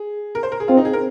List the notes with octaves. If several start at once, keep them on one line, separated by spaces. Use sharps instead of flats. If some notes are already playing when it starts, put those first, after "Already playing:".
Already playing: G#4
A#4
C5
A#4
G#4
C4 F4
D#4
G#4
A#4